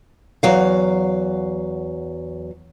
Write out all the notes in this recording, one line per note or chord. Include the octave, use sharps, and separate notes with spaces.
E2 F#3 F5